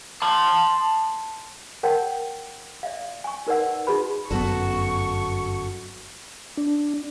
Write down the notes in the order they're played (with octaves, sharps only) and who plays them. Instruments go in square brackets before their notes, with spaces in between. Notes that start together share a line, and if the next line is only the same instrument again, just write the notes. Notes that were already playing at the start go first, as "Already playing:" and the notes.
[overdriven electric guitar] A5 C6
[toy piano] A#4 C#5 F#5 G5 A5
D5 E5 F5
G#5 C#6
D#4 A#4 B4 D5 F#5 E6
D#4 F#4 G#4 B4 B5
[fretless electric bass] G1 F#2 B3 [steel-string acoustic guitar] F#4 A4 [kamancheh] C#6
[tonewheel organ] D4